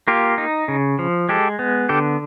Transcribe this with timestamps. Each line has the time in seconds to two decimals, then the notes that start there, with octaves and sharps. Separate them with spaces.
0.08 A#3 F4 G4
0.38 D#4
0.68 C#3
0.99 F3
1.29 G#3 G4 A4
1.59 B3
1.89 D3 G4 A4